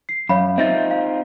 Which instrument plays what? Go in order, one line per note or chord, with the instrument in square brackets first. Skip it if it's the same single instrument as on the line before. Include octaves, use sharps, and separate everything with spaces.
[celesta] C7
[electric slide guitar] F#2 [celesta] C#5 F5 B5
[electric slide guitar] C4 D#4 F4 [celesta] E5 A6
[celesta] F5